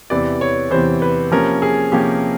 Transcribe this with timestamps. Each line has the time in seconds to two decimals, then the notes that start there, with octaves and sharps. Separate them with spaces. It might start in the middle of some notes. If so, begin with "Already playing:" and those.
0.10 E2 C3 E3 D5
0.41 C#5
0.71 E2 C3 E3 C5
1.02 B4
1.32 C3 F3 A#3 C#4 A#4
1.62 G#4
1.92 C3 F3 A#3 C#4 G4